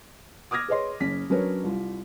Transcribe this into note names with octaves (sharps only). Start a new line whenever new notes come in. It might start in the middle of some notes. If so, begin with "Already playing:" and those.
D6 D#6 F6 G#6 A#6
G#4 B4 C#5 D#5 C6
F#1 C#4 B6
F#3 C#4 D4 A#4 B4 C#5
C2 F4